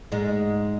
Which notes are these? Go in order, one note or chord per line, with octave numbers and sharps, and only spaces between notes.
G#2 G#3